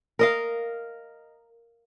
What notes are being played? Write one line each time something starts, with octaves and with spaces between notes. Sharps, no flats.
A#4 D#5 F5